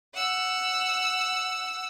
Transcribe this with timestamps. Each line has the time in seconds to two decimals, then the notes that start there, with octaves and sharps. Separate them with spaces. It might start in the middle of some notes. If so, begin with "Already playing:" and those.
0.13 F#5 E6